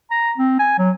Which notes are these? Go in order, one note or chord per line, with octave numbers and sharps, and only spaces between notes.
A#5
C4
G#5
F#3